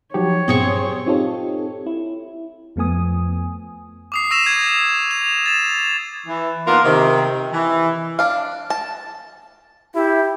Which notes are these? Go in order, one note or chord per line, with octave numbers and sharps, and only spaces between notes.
F3 F#3 D#4 G4 C#5
G2 A#2 B3 C4 G#4 C#6
C4 D#4 F4 G4 A4 C#5
E4
F2 F3 A3 B3 G#5 D#6
D6 D#6 C7
C#6 E6 A#6 E7 F7
G#6
F7
A6 E7
E3
A#3 B3 D4 D#4 F4 A#4
C3 D#3
E3
D4 F5
A5
E4 G4